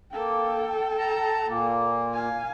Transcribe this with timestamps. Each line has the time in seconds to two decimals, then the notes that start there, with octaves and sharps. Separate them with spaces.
0.12 A#3 A4 G5
0.97 A5 A#5
1.47 A#2 A#3
2.14 F5 G#5